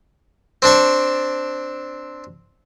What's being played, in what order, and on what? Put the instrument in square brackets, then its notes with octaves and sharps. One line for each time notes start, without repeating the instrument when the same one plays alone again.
[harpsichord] C4 D4 A5 C#6